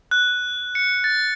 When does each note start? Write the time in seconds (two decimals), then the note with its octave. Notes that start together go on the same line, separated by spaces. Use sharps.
0.11 F#6
0.75 C#7
1.04 A6